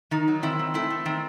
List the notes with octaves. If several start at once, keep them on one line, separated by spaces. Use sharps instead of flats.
D#3 D#4
F#3
D#3 C4 E4
C4
A3 C4 E4
A3
D#3 C4